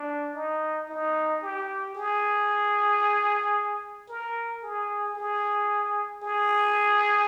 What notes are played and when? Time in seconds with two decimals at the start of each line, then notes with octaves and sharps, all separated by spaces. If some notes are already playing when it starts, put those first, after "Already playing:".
Already playing: D4
0.35 D#4
0.89 D#4
1.42 G4
1.95 G#4
4.09 A#4
4.63 G#4
5.16 G#4
6.23 G#4